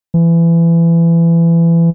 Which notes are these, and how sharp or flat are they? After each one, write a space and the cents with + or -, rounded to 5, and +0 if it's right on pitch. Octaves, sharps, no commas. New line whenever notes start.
E3 +25